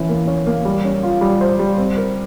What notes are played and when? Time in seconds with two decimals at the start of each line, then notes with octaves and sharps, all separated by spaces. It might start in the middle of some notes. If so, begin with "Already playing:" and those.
Already playing: E3 C#4
0.09 A#3
0.27 C#4
0.47 A#3
0.65 G3
0.85 C#4
1.03 F4
1.21 G3
1.41 C5
1.59 G3
1.78 C4
1.97 A#4